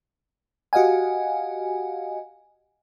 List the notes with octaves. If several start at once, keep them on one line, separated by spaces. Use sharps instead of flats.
F#4 G4 D#5 F5 F#5 G#5